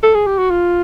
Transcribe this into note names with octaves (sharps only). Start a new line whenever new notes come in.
A4
G#4
G4
F#4
F4